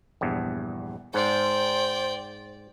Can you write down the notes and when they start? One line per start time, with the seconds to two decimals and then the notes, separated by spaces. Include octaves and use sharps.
0.21 A#1 E2 G2
1.14 G#2 C5 D5 G5